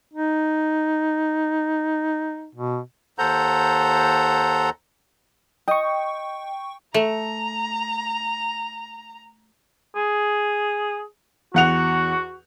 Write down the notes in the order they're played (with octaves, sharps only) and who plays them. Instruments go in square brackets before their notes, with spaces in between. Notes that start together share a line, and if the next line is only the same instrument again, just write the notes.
[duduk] D#4
B2
[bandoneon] D#2 A4 C5 F#5 A#5 G6
[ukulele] D#5 [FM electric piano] G5 C#6
[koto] A3 [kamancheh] A#5
[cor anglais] G#4
[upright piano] E2 F#5 F7 [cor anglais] F#4